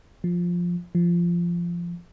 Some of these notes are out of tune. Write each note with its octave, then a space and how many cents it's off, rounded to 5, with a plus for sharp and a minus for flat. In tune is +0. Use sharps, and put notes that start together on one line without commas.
F3 +5
F3 -15